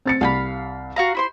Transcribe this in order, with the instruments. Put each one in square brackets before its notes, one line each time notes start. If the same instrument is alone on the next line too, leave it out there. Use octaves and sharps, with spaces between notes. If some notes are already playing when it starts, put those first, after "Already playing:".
[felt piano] C4 A6 C#7
[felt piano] C2 [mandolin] F5 G5 B5
[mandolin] F#4 F5 A#5
E4 C5 C6